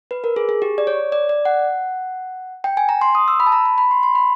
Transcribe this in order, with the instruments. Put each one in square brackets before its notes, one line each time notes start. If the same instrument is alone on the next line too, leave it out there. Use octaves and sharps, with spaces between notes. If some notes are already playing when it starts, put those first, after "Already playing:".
[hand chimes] B4
A#4
G#4
G#4
G4
D5
C#5
D5
D5
F#5
G5
G#5
A#5
C6
D#6
E6
B5
A5
A#5
B5
B5
C6
C6
B5